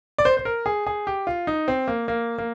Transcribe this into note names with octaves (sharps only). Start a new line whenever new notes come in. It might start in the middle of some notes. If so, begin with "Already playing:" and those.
D5
C5
C5
A#4
G#4
G#4
G4
F4
D#4
C4
A#3
A#3
A#3